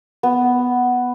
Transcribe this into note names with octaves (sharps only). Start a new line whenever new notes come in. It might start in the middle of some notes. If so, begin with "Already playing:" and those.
B3